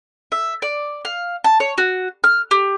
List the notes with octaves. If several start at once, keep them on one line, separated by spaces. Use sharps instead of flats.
E5
D5
F5
A5
C#5
F#4
F6
G4